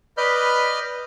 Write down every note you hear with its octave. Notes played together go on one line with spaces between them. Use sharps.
B4 D5 D#5 B5 F6 G6